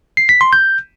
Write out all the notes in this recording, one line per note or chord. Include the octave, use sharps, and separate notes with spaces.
C7
B6
C6
G6